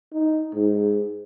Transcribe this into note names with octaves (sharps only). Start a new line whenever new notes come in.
D#4
G#2